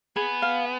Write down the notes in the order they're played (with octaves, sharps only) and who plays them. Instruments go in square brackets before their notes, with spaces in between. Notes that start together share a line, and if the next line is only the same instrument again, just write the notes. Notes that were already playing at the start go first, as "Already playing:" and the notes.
[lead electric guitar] B3 [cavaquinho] G#4
[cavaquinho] F5